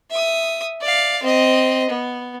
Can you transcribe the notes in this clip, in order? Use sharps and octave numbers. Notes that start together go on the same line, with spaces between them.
E5 D#6
D5 F5
C4 D#5
B3